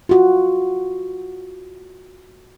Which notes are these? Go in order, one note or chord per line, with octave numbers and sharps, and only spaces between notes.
F4 F#4